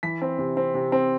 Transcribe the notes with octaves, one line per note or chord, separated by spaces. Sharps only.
E3 B6
C4
C3
C4
C3
C4